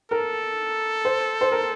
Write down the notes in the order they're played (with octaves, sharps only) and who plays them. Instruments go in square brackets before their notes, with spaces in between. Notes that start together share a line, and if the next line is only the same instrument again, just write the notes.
[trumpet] A4 [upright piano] A#4
[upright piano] C5
C5
A#4